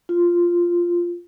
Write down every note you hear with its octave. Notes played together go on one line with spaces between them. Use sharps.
F4